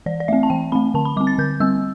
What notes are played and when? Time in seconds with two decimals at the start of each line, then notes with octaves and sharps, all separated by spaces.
0.06 E3 D5
0.20 D5
0.28 A3 C4 E5
0.43 A5
0.50 E3 G5
0.72 A3 C4 B5
0.94 D3 A5
1.05 B5
1.17 G3 D6
1.21 C4
1.27 A6
1.38 D3 G6
1.60 G3 C4 E6